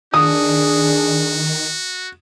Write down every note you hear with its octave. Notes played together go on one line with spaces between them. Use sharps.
D#3 D4 F#4 G#4 D#6